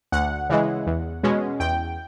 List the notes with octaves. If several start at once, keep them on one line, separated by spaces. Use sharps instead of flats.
D2 F#5
C#3 E3 G#3
E2
B2 G#3 C#4
E2 G5